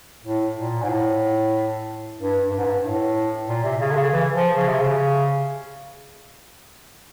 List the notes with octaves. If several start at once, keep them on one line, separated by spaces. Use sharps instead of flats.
A2
A#2
G#2
A2
G2
G2
G#2
G2
A2
A#2
C3
C#3
D3
C#3
E3
F3
C#3
C3
C#3